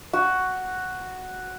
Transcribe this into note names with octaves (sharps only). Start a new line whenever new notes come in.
F#4